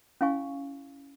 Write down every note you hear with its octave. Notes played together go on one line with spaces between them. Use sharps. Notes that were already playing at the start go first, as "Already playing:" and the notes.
C#4 E4 F5 G#5 C#6